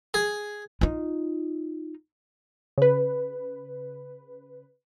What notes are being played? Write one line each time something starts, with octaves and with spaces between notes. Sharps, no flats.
G#4
D#4 F4
C#3 B4